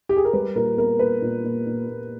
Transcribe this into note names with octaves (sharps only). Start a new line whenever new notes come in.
G4
G#4
A#4
G3 B4
A#2 A#4
B3 A#4
A#2 B4
A#2
A#2
A#2
A#2